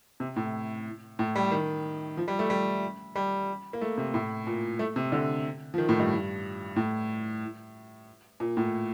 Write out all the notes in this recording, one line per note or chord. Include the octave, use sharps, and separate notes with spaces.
C3
A2
A2
G3
D#3
F3
G3
A3
G3
G3
A#3
A3
C3
A2
A#2
A3
C3
D3
F3
D#3
A2
G2
A2
A#2
A2